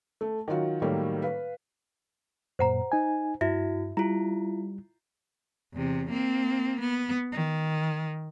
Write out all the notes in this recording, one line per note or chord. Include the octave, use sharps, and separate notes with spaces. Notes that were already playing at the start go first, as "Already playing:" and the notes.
A3
D#3 F#3 F4 F#4
A2 D#3 F#3 G3 A#3
B4 F5
F#2 A#2 C5 F#5 A#5
D#4 G#5
G2 E4 F#4 E5
G3 E4 F4 A#5
E2 C3
A#3 C4
B3
D#3